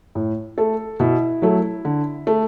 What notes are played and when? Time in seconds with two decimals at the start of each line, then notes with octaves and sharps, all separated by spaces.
0.15 A2
0.58 A3 A4
1.00 B2 E4
1.42 F#3 A3
1.85 D3
2.27 A3